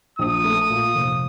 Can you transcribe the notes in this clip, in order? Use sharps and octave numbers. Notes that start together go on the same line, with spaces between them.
A#1 D#6
A3
A#2
F1